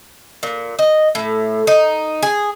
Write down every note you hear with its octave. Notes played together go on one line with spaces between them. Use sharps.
A#2
D#5
A2
D#4
G#4